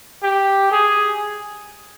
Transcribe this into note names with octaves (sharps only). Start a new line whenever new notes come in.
G4
G#4